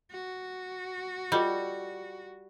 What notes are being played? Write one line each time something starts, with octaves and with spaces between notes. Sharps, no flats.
F#4
G3 F4 A4 D#5